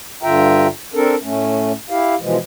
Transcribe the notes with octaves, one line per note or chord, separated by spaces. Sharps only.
G2 D3 F4 E5 G5 A#5
C4 D4 A4 A#4
A2 A3 C#4
E4 G4 F5
B2 E3 F3 G#3